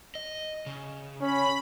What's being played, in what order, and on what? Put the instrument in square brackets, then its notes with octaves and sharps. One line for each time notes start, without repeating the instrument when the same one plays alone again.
[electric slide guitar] D#5
C#3
[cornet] C#4 [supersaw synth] B5